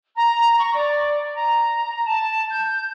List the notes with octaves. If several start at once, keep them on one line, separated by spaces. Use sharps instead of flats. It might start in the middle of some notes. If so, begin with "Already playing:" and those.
A#5
C#6
D5
A#5
A5
G6